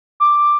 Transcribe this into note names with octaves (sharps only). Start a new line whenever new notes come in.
D6